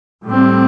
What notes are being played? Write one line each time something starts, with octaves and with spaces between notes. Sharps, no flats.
A2 G3 C4